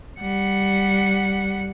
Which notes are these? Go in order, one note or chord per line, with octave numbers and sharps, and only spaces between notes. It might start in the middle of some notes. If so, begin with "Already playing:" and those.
G3 F#5